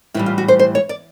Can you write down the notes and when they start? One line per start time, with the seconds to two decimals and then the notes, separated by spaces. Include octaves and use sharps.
0.14 A2 E3 G3 E4
0.26 F4
0.38 F#4
0.48 C5
0.59 C5
0.75 C#5
0.89 D5